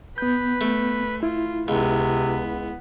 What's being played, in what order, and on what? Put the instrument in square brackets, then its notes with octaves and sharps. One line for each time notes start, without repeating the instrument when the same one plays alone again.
[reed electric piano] B3 G6 [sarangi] B4
[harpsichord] A3
[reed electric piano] E4 [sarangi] F4
[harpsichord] C#2 [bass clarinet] C3 [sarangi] B3